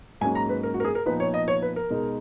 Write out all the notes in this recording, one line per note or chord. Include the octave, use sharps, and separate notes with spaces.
G#2 F#3 A#3 C#4 G#5
A#5
B4
A#4
F#4
A#4
G#4
A#4
A#2 F3 B3 D#4 B4
C#5
D#5
C#5
B4
A#4
B2 G#3 D#4